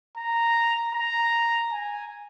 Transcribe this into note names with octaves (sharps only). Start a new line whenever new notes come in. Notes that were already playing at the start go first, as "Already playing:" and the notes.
A#5
A#5
G#5